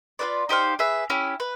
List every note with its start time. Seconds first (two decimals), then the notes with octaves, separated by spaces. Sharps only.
0.19 F4 G#4 B4 D5
0.49 D#4 G4 C5 F5
0.79 G#4 B4 E5
1.10 C#4 E4 G4
1.40 B4